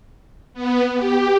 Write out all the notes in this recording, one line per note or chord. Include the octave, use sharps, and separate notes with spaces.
B3
G4